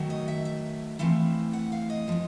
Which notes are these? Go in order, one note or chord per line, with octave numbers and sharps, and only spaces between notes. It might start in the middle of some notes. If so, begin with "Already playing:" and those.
Already playing: D#3 F#3 A3
D#5
E5
E5
E3 A3 C4 E4 F5
F#5
F5
D#5
F3 G#3 B3